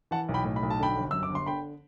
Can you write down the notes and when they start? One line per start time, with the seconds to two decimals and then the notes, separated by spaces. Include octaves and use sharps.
0.11 E3 F#5 A5
0.29 B1
0.34 G5 B5
0.45 A2
0.56 B5
0.63 B1
0.70 A5
0.80 D3 G5 B5
0.96 G1
1.11 F#2 E6
1.23 D6
1.29 G1
1.35 C6
1.46 D3 G5 B5